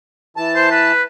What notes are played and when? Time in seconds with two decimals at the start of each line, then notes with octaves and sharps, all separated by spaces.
0.37 E3 A5
0.55 C5
0.71 B4